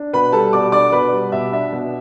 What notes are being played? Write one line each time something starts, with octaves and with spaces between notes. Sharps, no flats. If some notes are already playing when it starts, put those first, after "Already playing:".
Already playing: D4
B2 B4 B5
G3 A4 A5
B2 D5 D6
D4 D5 D6
B2 B4 B5
G3
B2 E5
D4 E5
B2